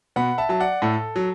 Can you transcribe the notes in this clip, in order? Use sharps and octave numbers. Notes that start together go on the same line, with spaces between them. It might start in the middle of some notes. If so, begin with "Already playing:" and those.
B2 F#5 B5
E5 A5
F#3 A5
D5 F#5
A2 A4
F#3